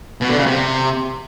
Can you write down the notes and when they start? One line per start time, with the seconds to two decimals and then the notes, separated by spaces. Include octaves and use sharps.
0.21 B2
0.29 D3
0.38 C#3
0.46 C3